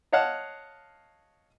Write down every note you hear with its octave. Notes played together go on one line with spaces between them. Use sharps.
C#5 D#5 F5 F#5 A5